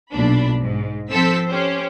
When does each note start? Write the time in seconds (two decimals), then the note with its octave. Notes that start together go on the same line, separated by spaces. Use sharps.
0.13 B1 A#2 D4 B5
0.59 G#2
1.11 F3 C4 A4 E6 B6
1.48 C#4 G4 C5